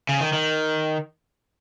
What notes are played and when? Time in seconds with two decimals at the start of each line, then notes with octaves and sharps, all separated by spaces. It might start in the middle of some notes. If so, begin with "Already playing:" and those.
0.09 C#3
0.21 D#3
0.33 D#3